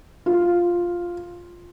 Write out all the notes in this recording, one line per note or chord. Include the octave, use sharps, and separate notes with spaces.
F4